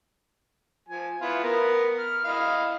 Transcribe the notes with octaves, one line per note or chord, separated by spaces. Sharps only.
F3 G#5
B3 E4 F4
B3 A#4
F6
E4 D#5 F5